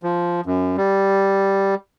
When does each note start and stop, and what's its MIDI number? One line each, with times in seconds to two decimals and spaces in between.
0.03 0.41 53
0.46 0.76 42
0.77 1.75 55